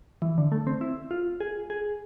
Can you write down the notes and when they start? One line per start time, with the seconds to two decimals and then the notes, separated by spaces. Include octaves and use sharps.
0.22 E3
0.38 D3
0.52 A3
0.67 C4
0.81 E4
1.11 F4
1.40 G#4
1.70 G#4